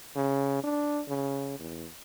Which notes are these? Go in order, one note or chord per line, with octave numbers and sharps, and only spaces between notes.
C#3
D4
C#3
E2